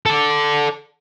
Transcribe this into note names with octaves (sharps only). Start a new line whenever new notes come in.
A4 D5